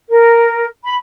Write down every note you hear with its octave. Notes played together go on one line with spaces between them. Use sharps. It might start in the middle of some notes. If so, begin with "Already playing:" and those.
A#4
B5